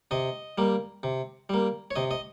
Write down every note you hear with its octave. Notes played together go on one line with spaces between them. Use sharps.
C3 D#5
G3 A#3
C3
G3 A#3
C#5
C3 D#5
D#5